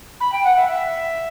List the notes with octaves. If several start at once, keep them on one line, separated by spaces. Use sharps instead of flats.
B5
G5
F#5
E5
E5